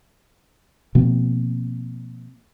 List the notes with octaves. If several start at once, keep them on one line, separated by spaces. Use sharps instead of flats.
B2 F3 A#3 C4